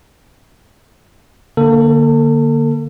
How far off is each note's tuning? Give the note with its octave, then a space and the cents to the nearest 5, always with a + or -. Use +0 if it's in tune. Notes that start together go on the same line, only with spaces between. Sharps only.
D3 +0 A#3 +0 A4 +35